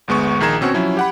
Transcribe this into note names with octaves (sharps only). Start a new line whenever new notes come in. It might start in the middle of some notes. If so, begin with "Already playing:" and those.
G1 D2 G#3 B3 C#6
A#1 D#3 G#4 A#5 G#6 E7
B2 C4 C#4 F#4
F3 F#3 C#4 E4
G4 F#5 B5